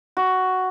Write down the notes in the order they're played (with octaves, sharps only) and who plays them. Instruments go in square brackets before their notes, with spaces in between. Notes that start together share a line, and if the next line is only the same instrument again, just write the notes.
[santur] F#4